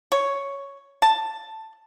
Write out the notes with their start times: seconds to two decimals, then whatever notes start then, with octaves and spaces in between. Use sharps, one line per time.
0.12 C#5
1.02 A5